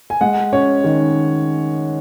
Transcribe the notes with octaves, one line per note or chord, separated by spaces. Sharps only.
G#5
G#3 F#5
C#4 C#5
D#3